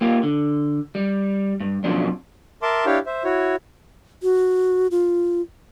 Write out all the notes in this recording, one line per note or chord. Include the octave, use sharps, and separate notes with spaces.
A#3 F4 G4
D3
G3
G2
F2 B2 F3 F#3 C#4 D4
A#4 E5 A5 C6 D6
D4 E4 G4 C#5 F5 G5
C5 E5
E4 F#4 C#5
F#4
F4